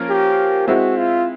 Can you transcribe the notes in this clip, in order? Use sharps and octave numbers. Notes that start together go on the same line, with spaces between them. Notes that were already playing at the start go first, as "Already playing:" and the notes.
Already playing: F3 A#3 C#4 F4 A#4
G4
G#3 C4 E4 F#4
F4